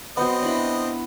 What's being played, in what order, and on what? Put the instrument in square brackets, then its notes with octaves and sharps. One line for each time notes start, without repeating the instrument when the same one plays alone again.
[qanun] F#3 C5 F#5 [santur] B3 [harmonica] C4 D#5
[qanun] D4 E4 B5